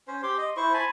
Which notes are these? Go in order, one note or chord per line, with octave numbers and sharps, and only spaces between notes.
C#4 C5
G4 C6
D#5
E4 C5 C#6
G#5 A5 B5